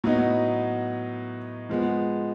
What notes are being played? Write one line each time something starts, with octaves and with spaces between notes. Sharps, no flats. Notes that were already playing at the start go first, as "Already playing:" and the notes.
A2 F#3 B3 D#4
F3 G#3 B3